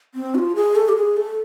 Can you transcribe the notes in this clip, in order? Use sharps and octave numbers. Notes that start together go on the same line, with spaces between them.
C4
F#4
F4
G#4
A4
G4
G#4
A4